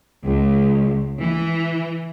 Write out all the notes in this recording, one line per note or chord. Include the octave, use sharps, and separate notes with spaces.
C#2
E3